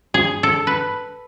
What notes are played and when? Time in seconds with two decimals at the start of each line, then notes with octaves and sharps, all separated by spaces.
0.14 G#4
0.43 A4
0.67 B4